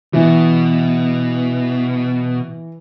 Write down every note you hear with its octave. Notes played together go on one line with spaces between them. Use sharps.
B2 E3